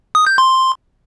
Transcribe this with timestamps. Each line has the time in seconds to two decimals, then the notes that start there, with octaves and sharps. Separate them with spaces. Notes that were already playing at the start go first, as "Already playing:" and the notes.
0.15 D#6
0.27 G6
0.38 C6